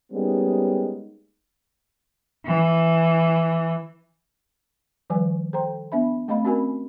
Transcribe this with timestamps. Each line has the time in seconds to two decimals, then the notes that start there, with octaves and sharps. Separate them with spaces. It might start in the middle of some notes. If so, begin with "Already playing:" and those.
0.12 G3 G#3 A#3 B3 C#4 D#4
2.46 E3
5.10 D#3 F3 G3 B4 G#5
5.53 A4 C5 G5 A#5 C6
5.92 B3 D4 E5 B5
6.28 A3 C4 D#5 F5 B5
6.45 C4 C#4 F#4 A#4 G#5 B5